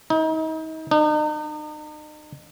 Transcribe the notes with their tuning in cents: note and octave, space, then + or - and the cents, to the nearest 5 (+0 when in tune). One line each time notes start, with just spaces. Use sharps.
D#4 +35
D#4 -40